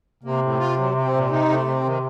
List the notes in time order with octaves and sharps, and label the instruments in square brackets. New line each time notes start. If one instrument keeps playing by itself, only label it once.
[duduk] C3 [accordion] A#3
[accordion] A2
F4
F#3
C4
A#2
D#4
A3
C4
D#3